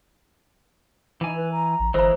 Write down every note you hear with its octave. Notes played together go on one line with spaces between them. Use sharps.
E3 D#4 G#5
B4
A#5
A1
G1 E3 G#3 A#4 C5 A#5